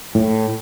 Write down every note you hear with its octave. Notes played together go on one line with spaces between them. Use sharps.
A2